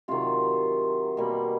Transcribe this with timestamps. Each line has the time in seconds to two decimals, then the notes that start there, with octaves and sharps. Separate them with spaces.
0.08 C3 D#3 F#3 F4
1.17 B2 G3 A#3